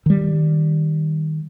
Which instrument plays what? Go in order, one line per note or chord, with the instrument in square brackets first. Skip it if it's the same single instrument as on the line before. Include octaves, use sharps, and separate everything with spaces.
[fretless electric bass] D#3 G3